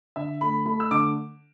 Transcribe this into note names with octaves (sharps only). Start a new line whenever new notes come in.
D3 E5
A3 B5
A3 B5
E6
D3 D6